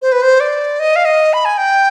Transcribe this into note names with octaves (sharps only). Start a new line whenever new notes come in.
C5
B4
C5
D5
D#5
F5
D#5
B5
G#5
G5